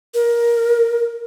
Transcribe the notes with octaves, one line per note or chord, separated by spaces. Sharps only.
A#4